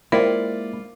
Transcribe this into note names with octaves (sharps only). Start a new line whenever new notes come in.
G#3 A#3 E4 F4 A#4 C5 D5 G5